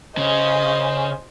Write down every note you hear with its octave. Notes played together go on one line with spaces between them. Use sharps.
C#3 C5 D#5